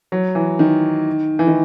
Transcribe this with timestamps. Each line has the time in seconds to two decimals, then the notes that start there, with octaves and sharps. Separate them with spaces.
0.12 F#3
0.35 E3
0.59 D#3
1.39 E3
1.47 D#3